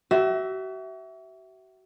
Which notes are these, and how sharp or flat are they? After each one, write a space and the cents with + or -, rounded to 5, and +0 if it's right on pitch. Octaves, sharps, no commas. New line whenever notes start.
F#4 +40 E5 -5